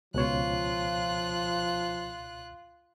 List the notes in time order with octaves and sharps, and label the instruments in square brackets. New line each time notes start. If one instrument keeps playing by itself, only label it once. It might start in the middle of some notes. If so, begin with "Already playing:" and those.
[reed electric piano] C#2 B2 C#5 [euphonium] F3 [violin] F4 F#6